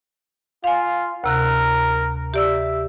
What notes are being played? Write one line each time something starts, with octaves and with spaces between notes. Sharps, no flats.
F4 F5 G#5
D2 C3 A#4 F#6
G4 D5 E5 E6